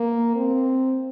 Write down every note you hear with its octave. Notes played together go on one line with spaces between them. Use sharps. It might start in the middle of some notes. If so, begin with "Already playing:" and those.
Already playing: A#3
C4